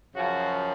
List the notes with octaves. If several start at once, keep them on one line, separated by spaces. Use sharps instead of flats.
F#2 C#3 F3 F#4